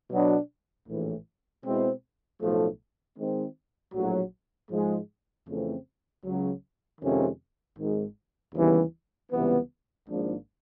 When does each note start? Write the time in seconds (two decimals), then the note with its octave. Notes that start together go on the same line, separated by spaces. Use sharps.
0.10 B2 F#3 B3 D4
0.87 A#1 A2 E3
1.63 B2 G#3 C4 E4
2.40 B1 A2 F3 A3
3.17 D#3 G#3 C4
3.94 A#1 A2 F#3
4.70 G#2 F3 G#3
5.48 F2 C#3 E3 A3 C4
6.23 C#2 C#3 F#3
7.01 F2 C3 D#3 G#3 C#4
7.78 G#1 G#2 D#3 G#3
8.54 D#2 C#3 E3 G3 B3
9.30 C#2 C3 E3 G3 B3
10.08 G#1 G#2 F3 A#3 D4